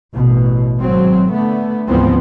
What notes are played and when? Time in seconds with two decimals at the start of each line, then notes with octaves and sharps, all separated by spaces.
0.14 A1 B2
0.78 G#1 F#3 C4
1.32 D3 A3 B3
1.88 D2 G#2 E3 F3 B3 C4